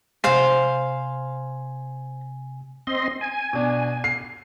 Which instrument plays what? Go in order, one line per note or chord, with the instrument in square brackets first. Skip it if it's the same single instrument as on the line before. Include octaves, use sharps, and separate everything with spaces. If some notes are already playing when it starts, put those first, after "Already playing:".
[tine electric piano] C3 G#5 [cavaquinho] C5 F5
[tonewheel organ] C4 D#5 C6
G#5
[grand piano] B2 D4
C7